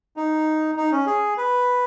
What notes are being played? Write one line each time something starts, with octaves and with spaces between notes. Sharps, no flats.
D#4
D#4
C#4
G#4
B4